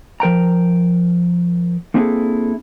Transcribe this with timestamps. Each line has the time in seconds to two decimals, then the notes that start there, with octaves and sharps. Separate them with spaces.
0.20 F3 A#4 G5 A#5
1.94 A#3 C4 D4 E4 G#4 A4